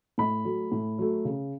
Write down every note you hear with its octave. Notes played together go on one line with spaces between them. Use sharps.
A2 B5
F#3 A3
A2
F#3 A3
C#3